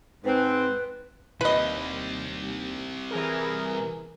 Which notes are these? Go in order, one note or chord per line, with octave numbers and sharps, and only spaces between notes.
G#2 C4 B4
D#2 C3 G3 B4 D#5
E3 G#4 A#4